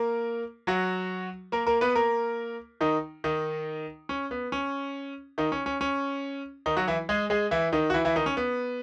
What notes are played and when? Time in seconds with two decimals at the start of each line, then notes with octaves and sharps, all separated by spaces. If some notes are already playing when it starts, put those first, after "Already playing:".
Already playing: A#3 A#4
0.67 F#3 F#4
1.52 A#3 A#4
1.67 A#3 A#4
1.81 B3 B4
1.95 A#3 A#4
2.81 D#3 D#4
3.24 D#3 D#4
4.09 C#4
4.31 B3
4.52 C#4
5.38 D#3 D#4
5.52 C#4
5.66 C#4
5.81 C#4
6.66 D#3 D#4
6.77 F#3 F#4
6.88 E3 E4
7.09 G#3 G#4
7.30 G#3 G#4
7.51 E3 E4
7.72 D#3 D#4
7.90 F#4
7.94 E3 E4
8.05 E3 E4
8.16 D#3 D#4
8.26 C#4
8.37 B3